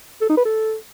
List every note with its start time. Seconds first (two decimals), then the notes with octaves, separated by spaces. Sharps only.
0.21 A4
0.29 D#4
0.37 B4
0.45 A4